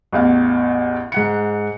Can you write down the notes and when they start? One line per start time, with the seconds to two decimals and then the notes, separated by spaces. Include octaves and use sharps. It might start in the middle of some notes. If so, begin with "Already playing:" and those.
0.12 A1 E2 F5
1.12 G#2 F#5 C#7